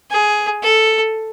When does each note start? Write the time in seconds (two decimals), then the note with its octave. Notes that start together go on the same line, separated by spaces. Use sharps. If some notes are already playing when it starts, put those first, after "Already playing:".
0.11 G#4
0.63 A4